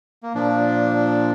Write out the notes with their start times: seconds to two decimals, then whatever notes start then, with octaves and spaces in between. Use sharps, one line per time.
0.23 A#3
0.35 A#2 F3 D4